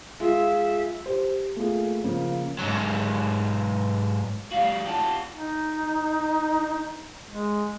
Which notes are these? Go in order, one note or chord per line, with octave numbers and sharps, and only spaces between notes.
G#3 F4 E5
G4 C5
A3 A#3 F4 G#4
C#3 F3 A#3
G#2 F#3
G3 F#4 F5
F4 G4 A5
D#4
G#3